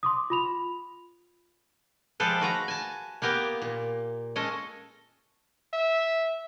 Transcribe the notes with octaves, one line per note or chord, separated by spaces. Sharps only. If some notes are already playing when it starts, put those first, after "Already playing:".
C6 D6 D#6
F4 B5 F7
F3 G#3 F4 G4 A4 B4
F#4 B4 A#5
G#5 A5
A#3 B3 G4 A#4
A#2
G#3 C#4 A4 D#5
E5